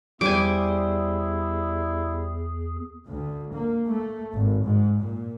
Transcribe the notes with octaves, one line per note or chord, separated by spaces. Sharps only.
E2 G3 E4 G#4 C5 G#5 D6
D2
A#3
A3
G#1
G#2
A#2